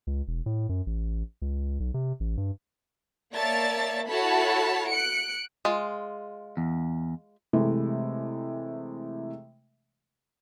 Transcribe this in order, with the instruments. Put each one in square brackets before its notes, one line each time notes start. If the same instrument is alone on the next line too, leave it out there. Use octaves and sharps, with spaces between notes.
[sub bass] C#2
E1
A2
F#2
A1
C#2
B1
C3
A1
G2
[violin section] A#3 C#5 D5 E5 A5 A6
E4 F#4 A4 C#5 A5 B5
F#6 C#7 D7
[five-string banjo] G#3 F4
[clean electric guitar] E2
[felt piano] C3 E3 G#3 A3